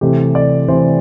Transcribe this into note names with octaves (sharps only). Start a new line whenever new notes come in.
C3 E3 A3 G4
D5
C3 E3 A3 C5